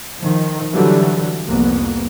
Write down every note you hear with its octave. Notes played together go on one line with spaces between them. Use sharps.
D#3 F3
D3 E3 F#3 G3
C2 F2 A#3 B3